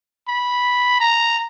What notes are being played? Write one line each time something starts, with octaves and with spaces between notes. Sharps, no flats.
B5
A#5